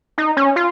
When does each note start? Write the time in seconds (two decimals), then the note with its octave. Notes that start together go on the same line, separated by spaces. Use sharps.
0.18 D#4
0.37 C#4
0.56 F4